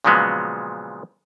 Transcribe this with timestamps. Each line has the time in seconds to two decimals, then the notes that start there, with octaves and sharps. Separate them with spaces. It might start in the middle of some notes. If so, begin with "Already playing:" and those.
0.04 A#2 C#3 F3 F#3 G#3 B3